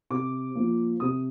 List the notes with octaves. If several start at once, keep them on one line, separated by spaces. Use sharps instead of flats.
C3 D6
F3 A#3
C3 D#6